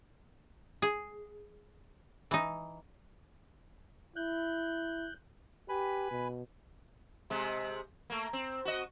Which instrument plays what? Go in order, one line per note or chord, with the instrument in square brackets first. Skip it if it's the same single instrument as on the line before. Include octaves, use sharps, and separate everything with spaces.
[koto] G#4
E3 D#4
[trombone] E4 [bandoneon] F#6 G6
[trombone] G4 [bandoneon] B4 G#5 B5
[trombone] B2
[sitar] C3 G#3
A3 A#3
C4
F#4 D#5